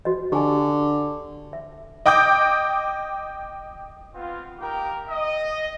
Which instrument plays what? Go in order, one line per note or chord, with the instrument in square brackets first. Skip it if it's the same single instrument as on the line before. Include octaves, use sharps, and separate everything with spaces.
[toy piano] F#4 D#5
[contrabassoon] D3 [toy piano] G4 G#5
[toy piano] E5
[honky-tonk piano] D#5 G5 D6 D#6 G6
[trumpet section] B3 C4 F4
A#3 D#4 G4 A#4 G5
D#5